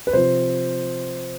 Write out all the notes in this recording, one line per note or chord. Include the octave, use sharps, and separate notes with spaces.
B4
C3 F3 C5